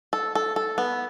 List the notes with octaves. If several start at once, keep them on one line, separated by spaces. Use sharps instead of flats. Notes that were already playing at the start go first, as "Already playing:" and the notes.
A4
A4
A4
B3